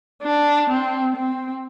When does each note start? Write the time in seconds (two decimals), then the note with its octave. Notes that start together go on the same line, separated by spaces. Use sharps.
0.23 D4
0.70 C4
1.16 C4